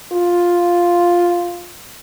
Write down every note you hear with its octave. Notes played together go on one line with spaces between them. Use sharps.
F4